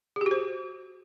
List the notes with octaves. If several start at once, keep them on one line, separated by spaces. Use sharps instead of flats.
G#4
G4
F#4
C5